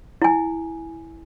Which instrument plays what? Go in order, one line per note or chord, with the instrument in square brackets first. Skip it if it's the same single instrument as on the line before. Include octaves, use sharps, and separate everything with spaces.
[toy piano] E4 G#5